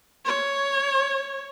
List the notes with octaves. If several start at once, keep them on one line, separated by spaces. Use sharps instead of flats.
C#5